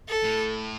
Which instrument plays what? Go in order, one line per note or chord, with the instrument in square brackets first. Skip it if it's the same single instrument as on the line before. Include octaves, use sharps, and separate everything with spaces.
[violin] A4
[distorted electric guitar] A2